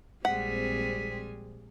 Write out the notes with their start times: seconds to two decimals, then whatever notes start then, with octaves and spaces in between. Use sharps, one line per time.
0.25 A#1 G3 G#3 C4 G#4 F#5 B6